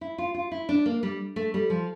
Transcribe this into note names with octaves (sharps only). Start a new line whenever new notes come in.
E4
F4
F4
E4
D4
A#3
G3
A3
G3
F3